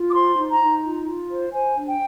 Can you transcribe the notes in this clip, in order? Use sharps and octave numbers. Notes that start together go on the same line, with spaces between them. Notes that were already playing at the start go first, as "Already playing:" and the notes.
Already playing: F4
D6
C5 C6
D#4
A#5
D#4
F4
F4
C5
C5 G#5
D4
G5